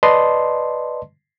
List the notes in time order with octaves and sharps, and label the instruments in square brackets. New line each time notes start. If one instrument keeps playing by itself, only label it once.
[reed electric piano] B4 D5 D#5 A5 C6